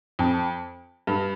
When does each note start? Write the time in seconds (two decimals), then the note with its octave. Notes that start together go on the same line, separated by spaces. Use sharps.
0.19 F2
1.07 G2